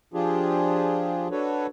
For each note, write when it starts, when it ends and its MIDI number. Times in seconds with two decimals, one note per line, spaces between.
0.14 1.28 53
0.14 1.28 62
0.14 1.28 65
0.14 1.28 67
0.14 1.28 68
1.31 1.67 62
1.31 1.67 66
1.31 1.67 69
1.31 1.67 71
1.31 1.67 73